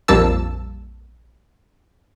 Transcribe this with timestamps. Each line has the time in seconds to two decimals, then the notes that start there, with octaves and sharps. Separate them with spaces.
0.08 A#1 F2 G3 A#3 A5 E6